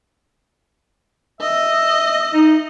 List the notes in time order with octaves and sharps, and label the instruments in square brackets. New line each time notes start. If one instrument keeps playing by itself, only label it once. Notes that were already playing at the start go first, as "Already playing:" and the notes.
[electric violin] D#5 [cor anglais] E5
[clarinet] D#4